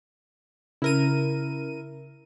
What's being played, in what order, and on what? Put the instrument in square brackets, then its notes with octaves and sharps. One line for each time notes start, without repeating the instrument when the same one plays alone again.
[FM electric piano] C#3 [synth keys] E4 A#4 D#7